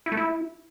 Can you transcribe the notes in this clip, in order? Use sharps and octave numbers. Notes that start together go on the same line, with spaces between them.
E4
A3
E4